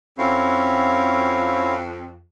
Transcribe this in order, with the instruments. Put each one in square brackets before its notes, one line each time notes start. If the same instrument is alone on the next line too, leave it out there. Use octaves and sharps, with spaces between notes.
[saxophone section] F2 [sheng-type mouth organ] C4 C#4 [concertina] E4 F#4 F5